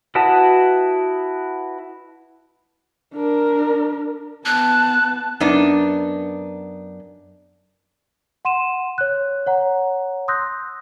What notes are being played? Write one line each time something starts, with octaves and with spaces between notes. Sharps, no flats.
E4 F#4 B4 D#5 A5
D4 A#4
B3 A5 F#6
F#2 B3 D4 D#4
F#5 C6 D#7 E7
C#5 F#6
C#5 F#5 A#5
C6 D#6 E6 F#6 G6 A#6